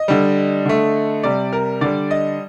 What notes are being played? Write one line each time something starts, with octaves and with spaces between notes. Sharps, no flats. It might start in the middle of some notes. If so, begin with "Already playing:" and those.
Already playing: D#5
D3 G3
D3 A3
C3 G3 D5
A#4
D3 G3 D5
D#5